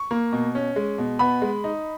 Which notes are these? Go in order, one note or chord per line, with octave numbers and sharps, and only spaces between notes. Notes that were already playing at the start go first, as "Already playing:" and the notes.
Already playing: C#6
A#3
B2
C#4
G#3
B2
B3 B5
G#3
D#4